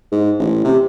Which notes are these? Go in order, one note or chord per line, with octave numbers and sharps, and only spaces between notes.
G#2
A1
C3